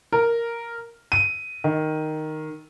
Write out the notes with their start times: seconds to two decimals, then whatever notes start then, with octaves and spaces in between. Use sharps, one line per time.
0.13 A#4
1.12 D#7
1.64 D#3